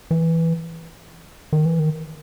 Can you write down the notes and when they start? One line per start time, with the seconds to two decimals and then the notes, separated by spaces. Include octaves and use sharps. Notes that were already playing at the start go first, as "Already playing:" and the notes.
0.11 E3
1.53 D#3
1.66 E3
1.79 D#3